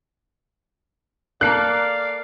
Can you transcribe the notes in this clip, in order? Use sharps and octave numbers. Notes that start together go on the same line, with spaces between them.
A#3 A4 A#4 D5 F5 F#6 C7